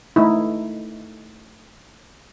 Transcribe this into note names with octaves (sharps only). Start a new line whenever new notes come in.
A3 D#4 E4